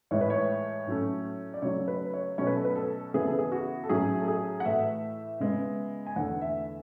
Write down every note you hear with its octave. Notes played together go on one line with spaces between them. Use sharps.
A2 E3 G#3 C#5
B4
C#5
A2 F#3 A3 C#4
D5
C#3 F#3 A3 C#5
B4
C#5
B2 F#3 A3 C#4 C#5
B4
A4
B4
A4
C#3 E3 B3 G#4
A4
G#4
F#4
A4
A2 F#3 C#4 G#4
A4
G#4
F#5
A2 E3 A3 E5
C#3 G#3 B3
G#5
E2 D3 A3 F#5
E5